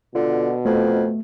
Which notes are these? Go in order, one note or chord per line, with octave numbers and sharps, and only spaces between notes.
B2 D3 F4
F2 A3